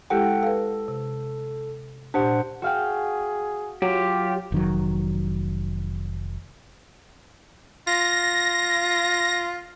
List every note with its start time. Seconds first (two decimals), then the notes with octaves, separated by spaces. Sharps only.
0.10 G#3 E4 G4 A4 F#5 G5
0.43 A4 B4 F5
0.88 C3
2.14 A#2 D4 G4 C5 F#5
2.62 F#4 G#4 F5 G5
3.82 F#3 F4 G4
4.52 F1 D#3 F#3
7.87 F4 A#6